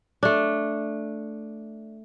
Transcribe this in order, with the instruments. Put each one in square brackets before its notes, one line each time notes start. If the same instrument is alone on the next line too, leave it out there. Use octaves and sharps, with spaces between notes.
[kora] A3 D4